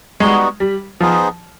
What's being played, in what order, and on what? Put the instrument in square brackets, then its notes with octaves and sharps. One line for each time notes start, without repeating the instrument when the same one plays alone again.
[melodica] G3 B3 D#4 F#4 [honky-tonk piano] G#3
[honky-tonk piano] G3
[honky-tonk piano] F3 [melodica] B3 D#4 G#4 C5